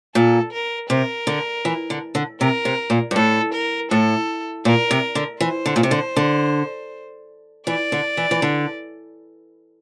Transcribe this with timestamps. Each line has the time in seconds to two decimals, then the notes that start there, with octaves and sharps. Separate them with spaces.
0.15 A#2 A4
0.52 A#4
0.90 C3 A#4
1.27 D3
1.65 E3
1.90 D3
2.15 D3
2.40 C3 A#4
2.65 C3
2.90 A#2
3.11 G2
3.15 A2 A4
3.53 A#4
3.91 A2 A4
4.65 A#2 A#4
4.91 C3
5.15 D3
5.41 E3 C5
5.66 D3
5.76 A#2
5.83 C3
5.91 D3
6.17 D3
7.67 E3 D5
7.92 D3
8.17 E3
8.31 E3
8.42 D3